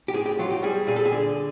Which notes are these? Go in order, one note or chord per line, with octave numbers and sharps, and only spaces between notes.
G4
A2 G#4
G4
F#3 F4
G4
G3 G#4
A#2 G#4
A4
G#4
D3